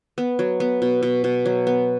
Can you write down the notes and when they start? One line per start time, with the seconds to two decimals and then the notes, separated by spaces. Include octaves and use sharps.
0.18 B3
0.39 F#3
0.60 B3
0.82 B2
1.03 B2
1.24 B2
1.45 F#3
1.67 B3